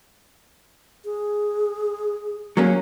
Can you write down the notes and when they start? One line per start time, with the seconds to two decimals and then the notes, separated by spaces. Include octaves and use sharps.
1.05 G#4
2.57 F#3 A#3 C#4 G#4